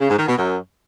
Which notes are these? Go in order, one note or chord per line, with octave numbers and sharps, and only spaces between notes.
C#3
G#2
D#3
B2
F#2